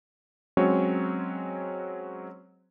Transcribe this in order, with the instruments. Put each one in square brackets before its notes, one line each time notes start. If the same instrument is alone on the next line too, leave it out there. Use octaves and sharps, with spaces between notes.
[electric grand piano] F#3 G#3 C4 C#4 F#4 C#5